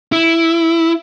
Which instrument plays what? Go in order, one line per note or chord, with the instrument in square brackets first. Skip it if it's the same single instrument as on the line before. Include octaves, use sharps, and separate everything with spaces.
[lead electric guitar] E4